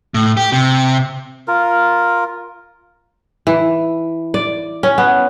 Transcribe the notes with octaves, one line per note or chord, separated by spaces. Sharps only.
A2
G4
C3
F4 A#4
E3
D5
C#4
B3